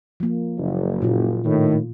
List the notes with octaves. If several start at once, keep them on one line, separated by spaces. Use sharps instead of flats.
F3 A#3
F#1
A#2 F4
A2 D#3